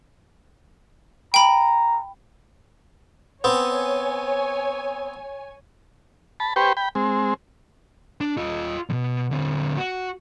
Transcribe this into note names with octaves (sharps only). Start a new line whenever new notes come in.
G5 A#5 B5
B3 C4 C#5 G#5
A5 B5
G4 B4 C5 G5 C#6
G5 B5
G#3 C4
D4
F4 D#5
E2 B2
D3 C4
F#4